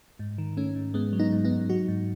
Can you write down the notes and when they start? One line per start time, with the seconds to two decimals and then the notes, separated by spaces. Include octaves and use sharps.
0.19 G#2
0.38 D#3
0.57 D#3 A3 C#4
0.75 G#2
0.94 G#2 G#3 B3
1.13 F#3
1.19 B3 D#4
1.32 G#2
1.45 B3 D#4
1.51 G#2
1.69 F#3 D#4 F#4
1.88 G#2